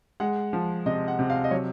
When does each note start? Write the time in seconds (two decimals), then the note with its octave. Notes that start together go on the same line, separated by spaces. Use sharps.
0.20 G#3 F#5
0.53 F3
0.86 C3 D#5
1.08 F#5
1.19 C3
1.30 F5
1.44 D#5
1.51 F#3 C#5